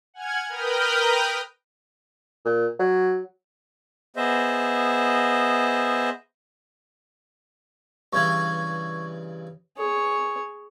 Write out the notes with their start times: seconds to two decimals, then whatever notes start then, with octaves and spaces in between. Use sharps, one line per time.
0.14 F#5 G#5 F6 G#6
0.49 A#4 B4 G5 D#6 F6 G6
2.45 A#2
2.79 F#3
4.16 B3 G#4 C5 D#5 E5
8.13 G2 C#3 E3 C#6 G#6
9.77 G#4 C#5